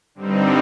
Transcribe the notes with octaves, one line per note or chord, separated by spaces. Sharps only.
G2 D3 G3 C4 D#4